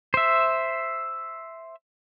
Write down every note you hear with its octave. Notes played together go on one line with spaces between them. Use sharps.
C5 E5